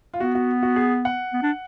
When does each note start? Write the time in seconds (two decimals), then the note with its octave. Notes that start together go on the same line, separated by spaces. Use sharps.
0.14 F4
0.20 B3 F#4
0.35 F#4
0.63 F#4
0.76 G#4
1.05 F#5
1.33 B3
1.43 D4